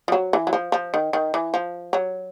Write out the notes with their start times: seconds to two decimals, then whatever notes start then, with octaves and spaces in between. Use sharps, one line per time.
0.08 F3
0.12 F#3
0.33 E3
0.47 F#3
0.53 F3
0.72 F3
0.94 D#3
1.13 D#3
1.34 E3
1.54 F3
1.93 F#3